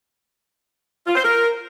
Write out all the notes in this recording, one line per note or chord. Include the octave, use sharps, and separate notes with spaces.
F4
C5
A#4